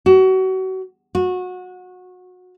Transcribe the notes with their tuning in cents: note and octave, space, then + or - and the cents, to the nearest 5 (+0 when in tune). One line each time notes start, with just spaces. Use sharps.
F#4 +30
F#4 -25